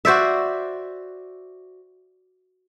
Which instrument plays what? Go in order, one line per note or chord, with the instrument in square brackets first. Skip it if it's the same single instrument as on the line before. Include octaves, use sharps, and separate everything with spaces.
[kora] F#4 C5 D5 E5